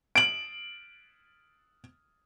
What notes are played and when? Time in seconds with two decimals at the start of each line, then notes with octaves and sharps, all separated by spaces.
0.16 D7 F#7